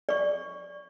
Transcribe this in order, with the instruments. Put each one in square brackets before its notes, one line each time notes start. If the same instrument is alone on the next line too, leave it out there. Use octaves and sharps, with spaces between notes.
[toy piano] D5 C#6